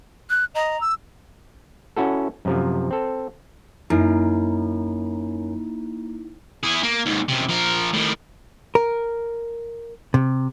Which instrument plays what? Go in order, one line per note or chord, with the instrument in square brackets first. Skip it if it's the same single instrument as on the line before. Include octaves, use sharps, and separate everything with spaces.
[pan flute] F#6
[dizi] D#5 [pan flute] A#5
[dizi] E6
[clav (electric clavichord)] C#4 E4 F#4 A4
F#2 C3 F3
C4 A4
[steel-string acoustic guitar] F#2 [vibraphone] A#3 [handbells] D#4 E4
[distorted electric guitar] E4 G#4
A#3
D#2 G#2
F#2 C3
F3 A#4
A2 D#3
[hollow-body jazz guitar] A#4
C3